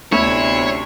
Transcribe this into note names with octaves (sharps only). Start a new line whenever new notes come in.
D2 C3 A3 B3 C#4 E4 C#5